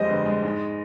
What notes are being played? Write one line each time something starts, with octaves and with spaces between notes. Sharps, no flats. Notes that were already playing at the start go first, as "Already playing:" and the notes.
Already playing: F2 G3 G#3 C5 D#5
G1
G#3
G#2